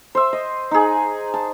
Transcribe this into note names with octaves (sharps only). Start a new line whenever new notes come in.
C5 E5
D#5
D#4 G#4
A5